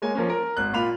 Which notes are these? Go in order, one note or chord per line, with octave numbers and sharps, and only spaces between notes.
G#3 A#3 C#5 G#5
F3 A#3 C#4
A#4
G#1 F#6
A#2 F4 B5 F7